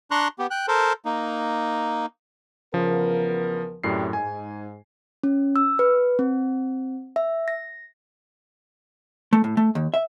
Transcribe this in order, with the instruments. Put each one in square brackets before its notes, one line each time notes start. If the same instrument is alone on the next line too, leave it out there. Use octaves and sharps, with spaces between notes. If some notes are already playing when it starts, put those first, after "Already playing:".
[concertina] D4 A#5 C6 C#6 F#6
B3 G4
G5 F#6
A4 A#4 C5
A#3 D#4
[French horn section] E2 B3 A#4 [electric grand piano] C#3 F3
[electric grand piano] F#2 A2 C7 [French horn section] C3 G3
[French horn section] G#2 [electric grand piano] G#5
[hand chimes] C#4
E6
B4
C4
E5
A#6
[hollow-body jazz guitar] A3
A2
A3
D#2
E5